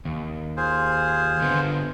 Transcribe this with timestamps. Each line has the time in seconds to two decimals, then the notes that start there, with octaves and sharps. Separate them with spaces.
0.05 D#2
0.57 F4 G#4 C5
1.41 D3 B3